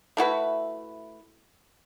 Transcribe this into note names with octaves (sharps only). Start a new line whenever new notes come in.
A3 E4 F#4 B4